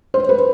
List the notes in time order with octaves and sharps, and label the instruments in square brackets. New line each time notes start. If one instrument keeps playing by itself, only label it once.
[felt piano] C5
B4